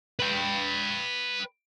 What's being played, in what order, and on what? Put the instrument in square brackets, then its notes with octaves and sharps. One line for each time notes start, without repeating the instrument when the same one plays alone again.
[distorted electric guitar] B4 G5